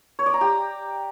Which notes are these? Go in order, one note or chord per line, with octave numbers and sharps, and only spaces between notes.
C#5
D5
A#5
G4